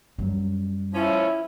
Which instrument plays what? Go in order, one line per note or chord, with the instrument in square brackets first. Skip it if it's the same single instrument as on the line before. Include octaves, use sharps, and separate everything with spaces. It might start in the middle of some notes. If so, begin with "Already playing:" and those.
[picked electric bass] F#2 F#3 [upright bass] G3
[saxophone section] F3 C#4 [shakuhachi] E4